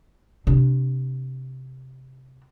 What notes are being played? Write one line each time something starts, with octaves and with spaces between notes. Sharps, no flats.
C3 D4